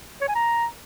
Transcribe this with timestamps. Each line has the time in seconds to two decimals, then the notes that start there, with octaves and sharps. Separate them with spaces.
0.21 C#5
0.28 G#5
0.35 A#5